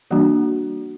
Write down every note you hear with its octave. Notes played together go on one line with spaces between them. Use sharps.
E3 G3 A#3 D4 F#4